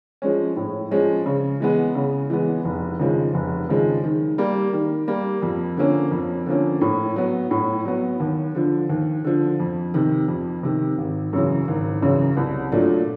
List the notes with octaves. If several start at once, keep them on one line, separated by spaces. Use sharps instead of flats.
F3 G#3 C#4
A2
F3 G#3 C#4
C#3
E3 G#3 B3
C#3
E3 G#3 B3
F1
D#2 C#3 F3 G#3
F1
D#2 C#3 F3 G#3
D#3
G3 A#3
D#3
G3 A#3
F2
D3 F3 A#3 C#4
F2
D3 F3 A#3 C#4
A2
F#3 B3
A2
F#3 B3
D#2
D3 F3
D#2
D3 F3
F2
C3 D#3
F2
C3 D#3
G#1
F#2 C#3 E3
G#1
F#2 C#3 E3
C2
A#2 F#3 A3 D4